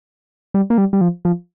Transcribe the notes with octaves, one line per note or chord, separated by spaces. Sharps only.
G3
A#3
G3
G3
F3
F3